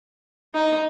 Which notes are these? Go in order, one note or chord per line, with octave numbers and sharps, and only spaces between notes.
D#4